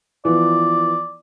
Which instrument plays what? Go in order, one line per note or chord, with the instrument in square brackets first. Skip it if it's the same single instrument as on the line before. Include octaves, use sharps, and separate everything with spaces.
[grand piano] E3 F3 B3 [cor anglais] D5